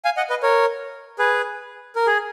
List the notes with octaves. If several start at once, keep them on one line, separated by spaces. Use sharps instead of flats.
F5 G#5
D#5 F#5
B4 D#5
A#4 C#5
G#4 B4
A#4
G#4